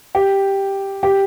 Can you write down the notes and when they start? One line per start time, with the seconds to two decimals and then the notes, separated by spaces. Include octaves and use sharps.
0.15 G4
1.03 G4